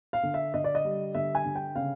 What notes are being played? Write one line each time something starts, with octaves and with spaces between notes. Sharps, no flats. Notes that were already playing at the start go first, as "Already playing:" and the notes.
F5
D3
E5
D3 D#5
D5
D#5
G3
D3 E5
G#5
D3
G5
C#3 F5